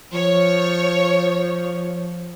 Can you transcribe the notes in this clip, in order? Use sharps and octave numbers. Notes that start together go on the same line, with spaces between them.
F3 C#5